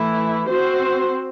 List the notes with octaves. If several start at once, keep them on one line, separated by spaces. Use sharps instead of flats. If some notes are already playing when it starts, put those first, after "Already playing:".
Already playing: E3 A3 E4
C4 F#4 C5